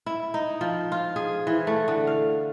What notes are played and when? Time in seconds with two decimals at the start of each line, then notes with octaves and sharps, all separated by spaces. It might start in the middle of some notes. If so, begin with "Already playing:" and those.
0.06 E4
0.34 D#4
0.61 F3
0.92 F4
1.16 G#4
1.47 E3
1.67 A3
1.88 D3
2.07 F5